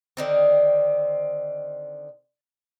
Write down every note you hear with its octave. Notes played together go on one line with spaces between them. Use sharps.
D3 D#3 C4